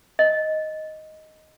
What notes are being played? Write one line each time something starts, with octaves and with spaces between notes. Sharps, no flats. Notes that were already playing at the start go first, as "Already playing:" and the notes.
D#5